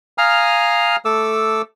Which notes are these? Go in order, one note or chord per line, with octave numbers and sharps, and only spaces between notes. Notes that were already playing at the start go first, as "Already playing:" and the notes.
F5 G#5 A#5 D#6 F6
A3 A4 D6 E6